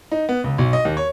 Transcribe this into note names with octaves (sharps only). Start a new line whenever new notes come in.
D#4
B3
C#2
B1
D#5
D#2
C#5